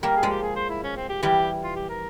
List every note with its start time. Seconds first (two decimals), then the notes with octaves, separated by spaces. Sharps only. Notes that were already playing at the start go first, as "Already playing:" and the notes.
0.03 G3 A#3 A#4
0.16 G#4
0.23 F3 G#3
0.30 G4
0.42 G#4
0.56 C5
0.70 E4
0.83 C#4
0.96 C4
1.09 G4
1.22 E3 G3 G4
1.63 F4
1.76 G4
1.89 A#4